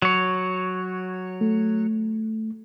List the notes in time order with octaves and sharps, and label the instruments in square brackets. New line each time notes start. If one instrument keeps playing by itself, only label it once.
[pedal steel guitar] F#3 C#5
[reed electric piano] A3